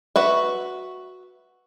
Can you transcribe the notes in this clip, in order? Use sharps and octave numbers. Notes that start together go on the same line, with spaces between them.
F#4 B4 E5